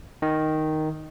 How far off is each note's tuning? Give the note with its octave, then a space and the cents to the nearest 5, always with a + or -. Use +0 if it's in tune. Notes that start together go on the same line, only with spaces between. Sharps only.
D#3 +0 D#5 +0